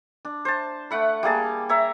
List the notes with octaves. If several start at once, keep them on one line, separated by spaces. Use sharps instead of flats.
D4
C5 A5
A3 F#5 B5
G3 A#3 G#4 A5
C#5 E5 A#5